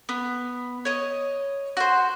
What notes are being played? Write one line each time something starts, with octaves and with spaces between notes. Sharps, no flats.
B3
C#5 D#5
F#4 C5